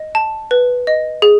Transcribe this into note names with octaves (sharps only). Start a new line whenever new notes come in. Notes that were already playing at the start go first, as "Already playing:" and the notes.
Already playing: D#5
A5
B4
D#5
G#4